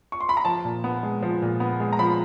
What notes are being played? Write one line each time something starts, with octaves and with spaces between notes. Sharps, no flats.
C#6
C6
B5
A#5
F3 A5
A#2
B3
G#3
F3
A#2
B3
G#3
A#5
F3 B5